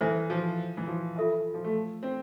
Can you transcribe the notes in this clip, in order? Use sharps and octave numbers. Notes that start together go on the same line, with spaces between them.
E3 E4 A4 C5 E5 G#5
F3
E3
F3
F4 A4 E5 A5
F3
A3
C4